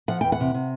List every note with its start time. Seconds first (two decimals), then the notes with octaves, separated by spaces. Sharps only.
0.08 F3 F#5
0.21 E2 G5
0.32 F#5
0.40 C3
0.54 C3